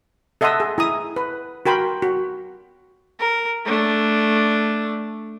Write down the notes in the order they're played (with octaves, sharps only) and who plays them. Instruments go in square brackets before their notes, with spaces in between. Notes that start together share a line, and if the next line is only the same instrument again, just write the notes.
[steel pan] A4 D#5 E5 F#5 C6 D#6
G#4
E4 A#5 D#6
B4
F#4 A#4 G5 B5 C6
F#4
[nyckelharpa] A#4
A3 D4